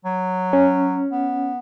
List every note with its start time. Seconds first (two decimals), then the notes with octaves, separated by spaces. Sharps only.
0.05 F#3
0.53 C#4
1.12 B3